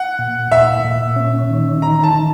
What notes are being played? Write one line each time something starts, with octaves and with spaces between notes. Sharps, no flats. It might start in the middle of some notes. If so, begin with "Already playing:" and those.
Already playing: F#5
A#2
A#2 E5
A#2
C#4
D#3
D#3 A#5
A5
D#3